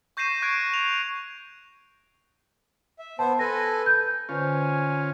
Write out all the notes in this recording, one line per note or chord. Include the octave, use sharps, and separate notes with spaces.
C#6 G6 A#6 C7 D#7 E7
C#6 F#6 G#6 D7
F7
E5
B3 C5 A5
A4 B4 G#5 A#6
G6
D3 C#4 F4 B4 C5 G#5